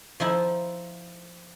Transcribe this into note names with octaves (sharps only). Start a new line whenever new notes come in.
F3 D#4 E4